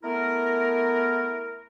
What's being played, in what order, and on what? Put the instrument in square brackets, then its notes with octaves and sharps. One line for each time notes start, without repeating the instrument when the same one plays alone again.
[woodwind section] A3 B3 E4 A#4